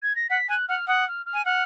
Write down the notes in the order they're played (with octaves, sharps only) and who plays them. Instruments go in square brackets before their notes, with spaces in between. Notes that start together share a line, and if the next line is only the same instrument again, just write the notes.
[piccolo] G#6
A#6
[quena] F#5 [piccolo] B6
[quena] G#5 [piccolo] F#6
[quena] F#5 [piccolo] F6
[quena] F#5 [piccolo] D#6
[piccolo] F6
F6
[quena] G#5
[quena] F#5 [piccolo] F6